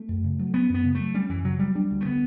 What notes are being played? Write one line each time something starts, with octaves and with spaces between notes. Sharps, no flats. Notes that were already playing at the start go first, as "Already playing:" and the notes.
Already playing: A3
F#2
C#3
F#3
B3 C#4
F#2 B3
C#3
F#3 A3
G3 C#4
F#2 E3
C#3 F#3
F#3 G3
G3 D4
D2
A3
D3 B3